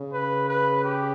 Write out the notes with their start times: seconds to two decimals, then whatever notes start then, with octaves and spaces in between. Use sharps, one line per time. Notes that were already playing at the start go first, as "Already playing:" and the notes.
Already playing: C#3
0.13 B4
0.49 B4
0.84 G4